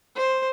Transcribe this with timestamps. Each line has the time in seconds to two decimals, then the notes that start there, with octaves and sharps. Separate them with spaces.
0.15 C5